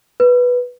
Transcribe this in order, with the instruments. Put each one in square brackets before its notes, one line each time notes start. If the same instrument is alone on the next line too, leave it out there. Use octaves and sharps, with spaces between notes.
[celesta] B4